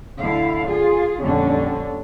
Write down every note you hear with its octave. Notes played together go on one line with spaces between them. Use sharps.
D2 D3 E4 F5
F4 G#4
F2 A#2 D3 G3 C#4 D4